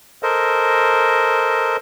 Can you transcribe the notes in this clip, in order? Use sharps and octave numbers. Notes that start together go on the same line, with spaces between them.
A4 A#4 C5 D#5